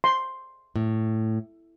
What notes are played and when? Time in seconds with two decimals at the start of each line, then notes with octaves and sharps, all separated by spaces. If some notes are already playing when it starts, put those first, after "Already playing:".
0.04 C6
0.76 A2